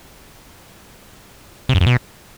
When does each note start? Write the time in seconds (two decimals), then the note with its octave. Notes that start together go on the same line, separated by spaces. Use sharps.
1.69 C3
1.75 F#2
1.81 F2
1.86 B2